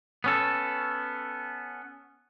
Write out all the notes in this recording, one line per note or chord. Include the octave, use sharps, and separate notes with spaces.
B3 C#4 A4